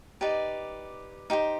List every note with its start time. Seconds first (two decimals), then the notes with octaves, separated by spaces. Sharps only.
0.21 D#4 G4 B4 D5
1.30 D#4 G4 C5